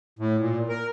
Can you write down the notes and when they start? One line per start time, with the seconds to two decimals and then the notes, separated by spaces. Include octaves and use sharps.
0.19 A2
0.40 A#2
0.69 A#4